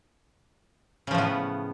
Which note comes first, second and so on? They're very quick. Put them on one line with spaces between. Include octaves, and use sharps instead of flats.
C#3 F3 A2 B3